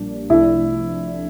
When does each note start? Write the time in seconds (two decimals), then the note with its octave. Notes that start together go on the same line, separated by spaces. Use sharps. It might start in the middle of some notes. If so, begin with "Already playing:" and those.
Already playing: A#1 A#2 G3 A#3 D4
0.30 C2 C3 F3 A3 D4 E4